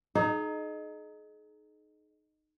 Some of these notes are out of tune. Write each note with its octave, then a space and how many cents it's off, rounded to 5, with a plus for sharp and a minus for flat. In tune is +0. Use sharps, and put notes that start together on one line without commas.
D#4 -15 G#4 +40